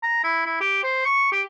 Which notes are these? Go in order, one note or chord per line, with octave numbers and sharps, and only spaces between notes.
A#5
E4
E4
G4
C5
C#6
G4